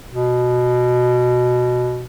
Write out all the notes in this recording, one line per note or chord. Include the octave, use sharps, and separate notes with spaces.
B2